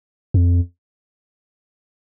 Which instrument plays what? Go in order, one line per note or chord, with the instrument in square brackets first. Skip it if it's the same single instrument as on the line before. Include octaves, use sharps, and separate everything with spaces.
[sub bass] F2